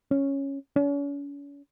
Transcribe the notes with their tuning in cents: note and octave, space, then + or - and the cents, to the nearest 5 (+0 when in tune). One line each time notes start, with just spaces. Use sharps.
C#4 -5
C#4 +40